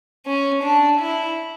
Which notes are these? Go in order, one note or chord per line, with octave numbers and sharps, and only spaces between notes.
C#4
D4
E4